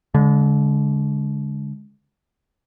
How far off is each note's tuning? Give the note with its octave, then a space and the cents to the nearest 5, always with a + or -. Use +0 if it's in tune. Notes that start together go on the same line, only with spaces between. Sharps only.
D3 -35 G#3 +0